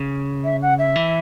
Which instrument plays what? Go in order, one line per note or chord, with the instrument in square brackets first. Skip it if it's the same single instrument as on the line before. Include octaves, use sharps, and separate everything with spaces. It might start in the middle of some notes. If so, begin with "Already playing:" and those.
Already playing: [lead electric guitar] C#3
[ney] E5
F#5
E5
[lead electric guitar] E3